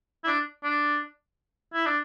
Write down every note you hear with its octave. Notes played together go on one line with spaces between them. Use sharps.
E4
D4
D4
E4
D4